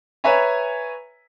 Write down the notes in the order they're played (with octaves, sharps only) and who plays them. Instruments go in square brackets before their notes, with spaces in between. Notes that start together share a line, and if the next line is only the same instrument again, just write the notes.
[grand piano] B4 C#5 E5 G#5 A#5